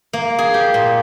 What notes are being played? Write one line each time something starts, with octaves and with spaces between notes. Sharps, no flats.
A#3
G#4
G4
A#2